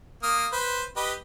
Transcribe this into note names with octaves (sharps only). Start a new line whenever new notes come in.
A#3 D#6 F6
B4 C5
G4 B4 D#5